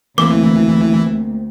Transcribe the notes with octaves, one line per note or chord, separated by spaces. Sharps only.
D2 E3 A#3 C4 D6